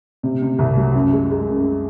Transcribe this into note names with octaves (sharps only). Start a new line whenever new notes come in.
C3
C3
C2
F#3
F#2
G#3
G#3
F#2